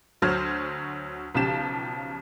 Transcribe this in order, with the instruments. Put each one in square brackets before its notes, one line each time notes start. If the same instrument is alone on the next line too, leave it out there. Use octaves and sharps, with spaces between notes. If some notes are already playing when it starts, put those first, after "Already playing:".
[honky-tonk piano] D2 F#3 C5 F6
B1 C#3 F3 G4 E7